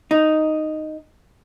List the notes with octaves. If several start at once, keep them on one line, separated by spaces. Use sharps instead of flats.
D#4